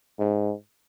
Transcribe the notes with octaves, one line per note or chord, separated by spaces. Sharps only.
G#2